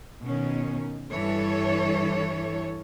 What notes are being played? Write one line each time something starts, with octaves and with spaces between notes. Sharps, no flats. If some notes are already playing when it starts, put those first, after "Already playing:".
B2 D#3 C#4
G2 E3 A4 C#5